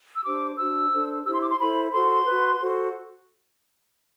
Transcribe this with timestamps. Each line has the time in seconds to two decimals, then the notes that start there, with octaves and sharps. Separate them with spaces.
0.16 E6
0.24 D4 G4 C5 D6
0.58 D4 F#4 C5 E6
0.92 D4 A4 C5
1.25 E4 G4 C5 E6
1.34 C6
1.42 D6
1.51 C6
1.59 E4 A4 C5 B5
1.93 F#4 A4 C5 C6
2.26 F#4 B4
2.60 F#4 A4 C5